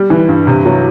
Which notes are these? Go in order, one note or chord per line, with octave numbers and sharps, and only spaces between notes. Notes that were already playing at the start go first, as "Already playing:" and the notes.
Already playing: G3
E3
G2
C3
F#3